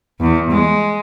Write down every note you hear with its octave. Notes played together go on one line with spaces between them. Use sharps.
E2
G#3